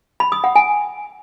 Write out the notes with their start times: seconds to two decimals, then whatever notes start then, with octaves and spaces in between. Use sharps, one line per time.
0.20 B5
0.32 D#6
0.44 F#5
0.56 G#5